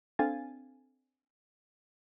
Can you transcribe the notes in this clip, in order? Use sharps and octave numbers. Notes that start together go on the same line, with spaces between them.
C4 D4 A4 F5 G#5 A6